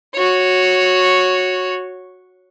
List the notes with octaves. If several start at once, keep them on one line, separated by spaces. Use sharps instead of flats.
F#4 C#5